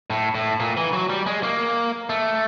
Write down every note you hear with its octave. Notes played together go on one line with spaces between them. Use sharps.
A2
A2
A#2
E3
F#3
G3
G#3
A#3
A3